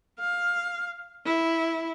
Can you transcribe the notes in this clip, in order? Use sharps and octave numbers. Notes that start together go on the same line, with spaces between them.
F5
E4